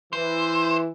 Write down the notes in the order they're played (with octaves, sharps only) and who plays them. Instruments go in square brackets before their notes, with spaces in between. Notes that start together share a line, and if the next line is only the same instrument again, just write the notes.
[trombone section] E3 [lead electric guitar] C5